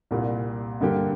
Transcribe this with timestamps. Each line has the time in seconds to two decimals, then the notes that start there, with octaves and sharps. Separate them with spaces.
0.11 C2 A#2 G3
0.80 G2 D3 A#3 G4